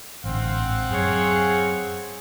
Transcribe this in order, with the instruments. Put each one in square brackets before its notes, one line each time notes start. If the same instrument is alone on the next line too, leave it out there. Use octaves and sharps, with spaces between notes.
[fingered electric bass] A1 G#2 D3 [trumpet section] C4 F5 F#5
[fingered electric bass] F#2 [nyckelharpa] G#4 C#5